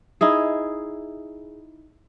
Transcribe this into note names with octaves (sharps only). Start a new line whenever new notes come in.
D#4 E4 G#4